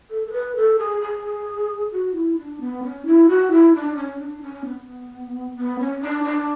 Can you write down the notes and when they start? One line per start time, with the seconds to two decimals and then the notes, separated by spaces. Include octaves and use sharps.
0.10 A4
0.27 A4
0.32 B4
0.56 A4
0.79 G#4
1.01 G#4
1.92 F#4
2.15 E4
2.37 D4
2.60 B3
2.83 C#4
3.06 E4
3.29 F#4
3.51 E4
3.75 D4
3.97 C#4
4.19 D4
4.42 C#4
4.65 B3
5.57 B3
5.80 C#4
6.01 D4
6.24 D4